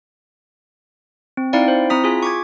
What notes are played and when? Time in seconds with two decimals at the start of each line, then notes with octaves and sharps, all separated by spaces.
1.37 C4
1.53 C4 D#4 E4 D5 F5 G5
1.68 C5
1.90 C4 E4 A#5 D#6 B6
2.04 F4 G#4 G#5 B6
2.23 C#6 D6 G#6